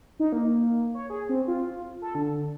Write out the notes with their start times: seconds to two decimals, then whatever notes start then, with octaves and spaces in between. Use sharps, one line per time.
0.20 D#4
0.32 A#3
0.94 C#5
1.10 G#4
1.29 C4
1.48 F4
2.02 A4
2.15 D3